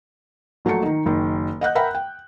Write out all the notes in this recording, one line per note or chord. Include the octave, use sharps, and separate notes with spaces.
A#1 F#3 A3 A#3 A5 C#7
D#3 D#4
F#1 D#3
D#5 F#5 F#6 G6
A#4 E5 F#5 G5 B5
G5